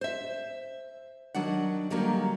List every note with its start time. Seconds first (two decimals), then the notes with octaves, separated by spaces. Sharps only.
0.01 C5 E5
1.35 D#3 F#3 D4 F#5
1.90 D3 D#3 F#3 G3 A#3